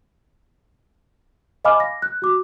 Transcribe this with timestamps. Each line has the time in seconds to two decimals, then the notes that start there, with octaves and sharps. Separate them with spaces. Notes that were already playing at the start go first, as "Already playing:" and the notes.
1.65 D#5 F5 G#5 B5 D6 F6
1.80 A#6
2.02 F#6
2.22 F#4 D6